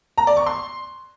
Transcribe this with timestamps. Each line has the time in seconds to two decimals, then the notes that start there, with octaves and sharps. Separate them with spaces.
0.18 A#5
0.27 D5
0.37 C#6
0.47 C6